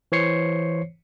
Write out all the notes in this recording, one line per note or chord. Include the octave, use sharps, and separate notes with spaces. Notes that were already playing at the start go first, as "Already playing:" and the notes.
E3 C5 C#5 C7 C#7